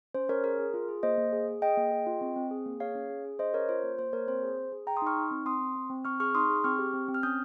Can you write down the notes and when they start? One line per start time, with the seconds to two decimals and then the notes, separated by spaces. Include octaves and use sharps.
0.14 C#4 C5
0.29 C#4 A#4 C#5
0.44 G#4 A#4
0.59 G#4
0.74 F4
0.88 G#4
1.03 A#3 C5 D#5
1.18 A#3
1.33 G#4
1.48 G#4
1.62 G#4 D#5 G5
1.77 A#3
1.92 G#4
2.06 F4
2.21 C4
2.36 C4
2.51 G#4
2.66 A#3
2.80 G#4 C#5 F5
2.95 C#4
3.10 G#4
3.25 G#4
3.39 C#4 C5 D#5
3.54 C#4 A#4 C#5
3.69 F4 C5
3.83 A#3
3.99 A#3 C5
4.13 A#3 A#4 C#5
4.28 C4 C5
4.43 G#4
4.57 G#4
4.72 G#4
4.87 G#4 G5 A#5
4.97 C6 D#6
5.02 D#4 C#6 F6
5.17 D#4
5.31 C4
5.46 C4 C6 D#6
5.61 C4
5.76 C4
5.90 C4
6.05 C4 C#6 F6
6.20 G#4 C#6 F6
6.35 D#4 C6 D#6
6.50 G#4
6.64 C4 C#6 F6
6.79 G4
6.94 C4
7.09 C4
7.14 F6
7.23 C#4 D#6 G6